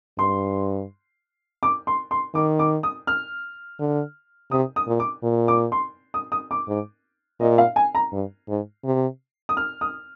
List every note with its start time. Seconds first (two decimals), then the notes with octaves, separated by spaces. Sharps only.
0.18 G2 C6
1.63 D6
1.87 C6
2.11 C6
2.34 D#3 D6
2.59 D6
2.83 D#6
3.07 F6
3.80 D3
4.51 C3 D#6
4.76 D#6
4.87 A#2
5.00 D6
5.23 A#2
5.48 D6
5.72 C6
6.14 D#6
6.32 D#6
6.51 D6
6.68 G#2
7.40 A#2 D#5
7.58 F5
7.76 G#5
7.95 A#5
8.12 G2
8.49 G#2
8.84 C3
9.49 D#6
9.57 F6
9.81 D#6